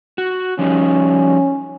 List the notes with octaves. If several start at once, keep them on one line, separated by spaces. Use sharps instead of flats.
F#4
F3 G3 C#4 D#4